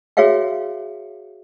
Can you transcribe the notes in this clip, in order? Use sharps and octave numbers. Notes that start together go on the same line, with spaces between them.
F#4 G#4 C#5 E5 F5 G5